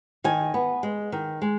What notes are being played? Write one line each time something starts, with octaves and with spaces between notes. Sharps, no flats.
D#3 G#5
B3
G#3
D#3
G#3